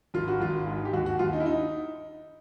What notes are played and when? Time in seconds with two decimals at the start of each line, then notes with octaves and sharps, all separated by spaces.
0.14 G#1 F4
0.28 F#4
0.40 G#1 F4
0.67 G#2
0.85 G4
0.93 D#2 F#4
1.06 F#4
1.19 D#2 F4
1.33 D#4
1.40 E4
1.46 D#4